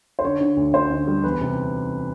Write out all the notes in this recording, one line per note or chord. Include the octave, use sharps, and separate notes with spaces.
C5
D3 C#5
D3
D2
D2 C5
D3
G3
E2 B4
C3